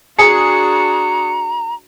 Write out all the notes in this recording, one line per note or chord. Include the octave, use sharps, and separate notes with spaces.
D4 F#4 G#4 A#5 C#7